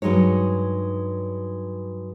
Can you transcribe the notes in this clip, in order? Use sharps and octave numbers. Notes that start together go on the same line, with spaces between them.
G2 F#3 G#3 D#4 C#5